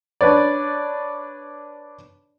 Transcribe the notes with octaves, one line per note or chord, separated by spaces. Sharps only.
D4 B4 C#5 D5